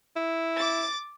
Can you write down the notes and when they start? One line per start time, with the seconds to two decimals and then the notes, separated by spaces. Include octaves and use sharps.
0.16 E4
0.57 D6 A6